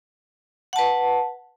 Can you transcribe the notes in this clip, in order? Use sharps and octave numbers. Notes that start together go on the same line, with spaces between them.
B4 F#5 A5